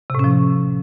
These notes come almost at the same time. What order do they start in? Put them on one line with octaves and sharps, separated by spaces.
C3 A2 C#4 F3